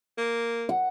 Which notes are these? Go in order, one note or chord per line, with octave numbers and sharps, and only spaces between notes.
A#3
F#5